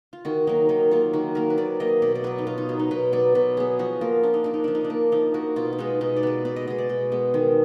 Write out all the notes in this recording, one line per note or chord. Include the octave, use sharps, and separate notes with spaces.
F4
D#3 F#4
F#3 A#3 D#4
D#3 D#4
F#3 A#3 F4
D#3 F#4
F#3 A#3 A#4
B4
D#3 D5
F#3 A#3 D#5
B2 D5
D5
F#3 B3 B4
D#4
B2 F4
D#4
F#3 B3
D#4
B2 B4
F#3 B3 D5
B2 B4
F#3 B3 G#4
F3 F#4
A#3 F4
F3 D4
D#4
A#3 D4
D#4
F3 D4
D#4
D4
A#3
F3 D#4
A#3 F#4
B2 F4
F4
G#3 B3 D#4
B2 D#4
D5
G#3 B3 B4
B2 D5
D#5
G#3 B3 D#5
D5
B2
G#3 B3
D#3